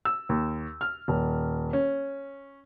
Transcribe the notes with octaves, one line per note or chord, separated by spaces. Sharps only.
E6
D#2
F6
D#1
C#4